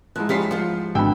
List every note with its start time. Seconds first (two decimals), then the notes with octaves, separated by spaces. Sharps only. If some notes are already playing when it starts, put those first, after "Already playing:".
0.16 G#2 F3 E4 F#6
0.29 F3 G3 C#4 G4 B6 C7
0.51 F3 F4 F#5
0.95 G#1 B2 D3 G5 B5 E6